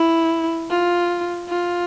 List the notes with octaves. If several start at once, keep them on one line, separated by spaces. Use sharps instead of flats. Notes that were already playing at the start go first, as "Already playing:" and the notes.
Already playing: E4
F4
F4